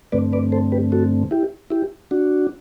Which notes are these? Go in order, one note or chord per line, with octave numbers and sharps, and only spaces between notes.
G2 D3 A3 C4 B4 D5
B4 D5
A4 C5
G4 B4
F#4 A4
E4 G4
E4 G4
D4 F#4